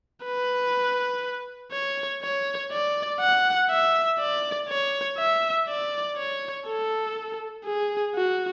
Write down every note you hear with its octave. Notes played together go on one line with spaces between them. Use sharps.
B4
C#5
C#5
D5
F#5
E5
D5
C#5
E5
D5
C#5
A4
G#4
F#4